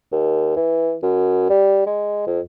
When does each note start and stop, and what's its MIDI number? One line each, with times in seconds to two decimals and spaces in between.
0.12 0.56 39
0.56 0.96 52
1.03 1.46 42
1.50 1.83 55
1.87 2.25 56
2.27 2.40 41